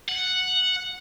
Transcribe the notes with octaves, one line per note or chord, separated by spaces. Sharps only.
F#5